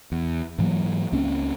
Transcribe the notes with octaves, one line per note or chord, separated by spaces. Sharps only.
E2
G#2 E3 F#3 A#3
C#2 A#3 C4 C#4